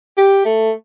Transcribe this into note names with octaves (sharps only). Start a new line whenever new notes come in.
G4
A3